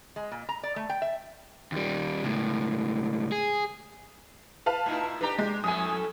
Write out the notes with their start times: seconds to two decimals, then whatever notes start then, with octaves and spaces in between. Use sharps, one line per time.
0.16 G#3
0.32 A#2
0.49 A#5
0.63 D5
0.76 A3
0.90 G5
1.02 E5
1.72 D#2 G3
2.24 C#2 A2
3.32 G#4
4.66 B4 F5 A5
4.86 A2 D#4 E4
5.21 D4 G4 B4 A#5
5.39 G#3
5.64 F2 A2 A3 G#5 D#6